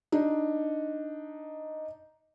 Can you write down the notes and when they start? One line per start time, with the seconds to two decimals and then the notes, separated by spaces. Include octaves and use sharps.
0.12 D4 D#4